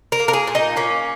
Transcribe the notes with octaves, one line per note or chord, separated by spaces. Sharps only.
A#4
A#3
A#4
G#4
A#2
D#4
A#3 C#4